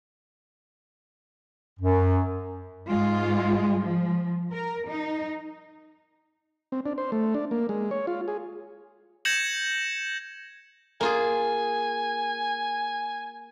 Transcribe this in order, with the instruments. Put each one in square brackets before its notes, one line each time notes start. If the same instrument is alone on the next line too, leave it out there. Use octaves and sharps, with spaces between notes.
[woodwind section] F#2
[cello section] G#2 G#3 F4
F3
A#4
D#4
[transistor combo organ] C4
D4
C5
A3
D4
A#3
G#3
C#5
F4
G#4
[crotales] G6 G#6 A#6 C#7 E7 F#7
[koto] A#3 F4 G#4 [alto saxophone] G#5